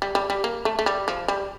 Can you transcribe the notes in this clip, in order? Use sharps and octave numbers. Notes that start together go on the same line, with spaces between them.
G3
G3
G3
A#3
A3
A3
G3
F3
G3